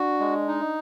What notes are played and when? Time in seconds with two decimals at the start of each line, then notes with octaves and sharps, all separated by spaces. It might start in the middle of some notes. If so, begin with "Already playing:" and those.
Already playing: D4 F#4
0.20 G#3
0.48 D#4